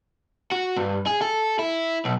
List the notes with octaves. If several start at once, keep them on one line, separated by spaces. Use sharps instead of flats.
F#4
G2
G#4
A4
E4
B1